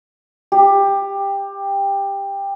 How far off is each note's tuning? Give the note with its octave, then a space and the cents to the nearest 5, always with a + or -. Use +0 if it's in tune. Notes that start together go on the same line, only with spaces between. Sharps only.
G4 +15